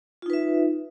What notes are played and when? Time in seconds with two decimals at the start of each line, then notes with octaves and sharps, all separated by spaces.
0.22 F4
0.26 D#4
0.30 B4
0.33 E5